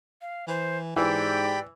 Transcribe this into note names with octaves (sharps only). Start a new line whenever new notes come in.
F5
E3 C5
G#2 E3 G4 D5 G5 B5